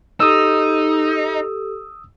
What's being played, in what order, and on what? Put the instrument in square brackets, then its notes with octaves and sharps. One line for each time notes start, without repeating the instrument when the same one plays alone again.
[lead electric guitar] D#4 [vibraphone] G4 A4 [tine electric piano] D#6 E6